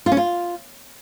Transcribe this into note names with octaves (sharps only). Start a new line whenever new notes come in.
F4
C#4
F4